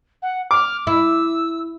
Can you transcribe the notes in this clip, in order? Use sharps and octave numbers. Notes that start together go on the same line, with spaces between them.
F#5
D6 F6
E4 E6